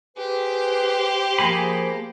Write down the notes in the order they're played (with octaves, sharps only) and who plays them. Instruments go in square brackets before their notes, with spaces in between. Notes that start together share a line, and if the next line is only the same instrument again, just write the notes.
[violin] G4 C5 [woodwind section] G#4 B4
[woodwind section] F3 [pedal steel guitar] A#3 G#4 B5